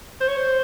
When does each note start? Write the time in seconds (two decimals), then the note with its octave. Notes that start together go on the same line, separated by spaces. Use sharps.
0.21 C5
0.28 C#5
0.37 C5